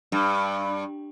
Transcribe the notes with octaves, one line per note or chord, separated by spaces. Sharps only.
G2